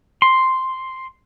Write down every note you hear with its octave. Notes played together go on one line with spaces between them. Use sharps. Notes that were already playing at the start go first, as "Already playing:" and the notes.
C6